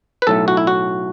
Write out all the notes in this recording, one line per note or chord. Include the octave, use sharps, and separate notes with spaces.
B4
B1 A2 A3 A4
F#4
E4
F#4